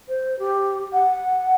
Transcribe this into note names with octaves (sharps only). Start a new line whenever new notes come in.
C5
G4
F#5